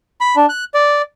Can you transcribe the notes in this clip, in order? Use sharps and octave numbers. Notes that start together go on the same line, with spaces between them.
B5
D4
F#6
D5